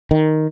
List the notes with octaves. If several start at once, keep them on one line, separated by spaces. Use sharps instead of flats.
D#3